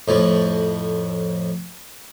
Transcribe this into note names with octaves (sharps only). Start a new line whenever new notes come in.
F2 A2 F3